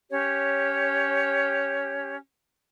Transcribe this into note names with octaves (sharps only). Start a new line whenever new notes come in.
C#4 G4 C#5